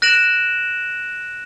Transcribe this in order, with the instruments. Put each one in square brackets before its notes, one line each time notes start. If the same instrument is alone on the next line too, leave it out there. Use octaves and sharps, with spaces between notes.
[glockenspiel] F#6 A#6 D7 E7 F#7